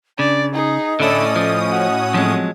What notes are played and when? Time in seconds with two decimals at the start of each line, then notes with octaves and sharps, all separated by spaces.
0.19 C#3 D4 D5
0.54 D#4 G#4 D#5
1.00 A2 D3 C#4 E4 A4 D5 D#6
1.36 F3
1.71 F#4
2.14 F3 F#3 G#3 C4